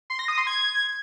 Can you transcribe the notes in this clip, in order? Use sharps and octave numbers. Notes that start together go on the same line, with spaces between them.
C6
A#6
D#6
C6
G#6